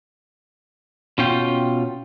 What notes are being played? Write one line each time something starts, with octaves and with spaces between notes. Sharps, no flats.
B2 C#4 F4 G5